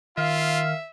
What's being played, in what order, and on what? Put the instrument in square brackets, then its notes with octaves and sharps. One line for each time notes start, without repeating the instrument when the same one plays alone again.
[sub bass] D#3 [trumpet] F4 [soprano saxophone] E5 [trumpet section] F5